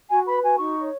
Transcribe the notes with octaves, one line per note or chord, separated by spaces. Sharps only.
F#4 G#5
B4 B5
F#4 G#5
D#4 C#6
C#5